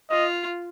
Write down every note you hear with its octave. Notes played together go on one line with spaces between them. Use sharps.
F4 D#5